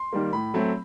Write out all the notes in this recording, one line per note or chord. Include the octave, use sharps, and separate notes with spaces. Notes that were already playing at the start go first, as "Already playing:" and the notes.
Already playing: C6
D#3 G3 A#3
A2 B5
F#3 A3 C4